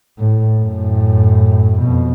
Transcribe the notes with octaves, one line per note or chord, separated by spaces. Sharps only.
A2
F#2 A2
F2 B2